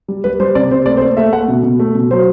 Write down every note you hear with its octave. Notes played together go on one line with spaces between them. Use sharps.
G3
G3 B4
G3 C5
C3 D5
C3 C5
A3 D5
C5
A3 D5
A3 E5
A3 F#5
B2
B2
A3
B2
F#3 C5